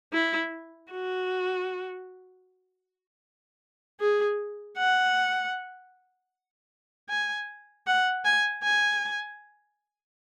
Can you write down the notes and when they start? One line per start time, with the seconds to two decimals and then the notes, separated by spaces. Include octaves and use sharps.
0.13 E4
0.91 F#4
4.00 G#4
4.78 F#5
7.09 G#5
7.87 F#5
8.25 G#5
8.63 G#5